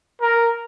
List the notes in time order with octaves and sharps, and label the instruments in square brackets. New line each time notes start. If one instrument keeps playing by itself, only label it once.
[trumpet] A#4